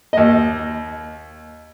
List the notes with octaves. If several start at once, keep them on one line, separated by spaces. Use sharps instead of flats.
D#2 D#5